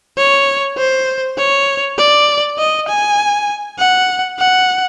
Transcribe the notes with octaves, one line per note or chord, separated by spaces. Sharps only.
C#5
C5
C#5
D5
D#5
G#5
F#5
F#5